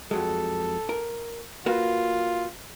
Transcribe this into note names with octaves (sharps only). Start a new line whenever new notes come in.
F2 F#3 G#3 A4
A#4
A#3 F4 F#4 B4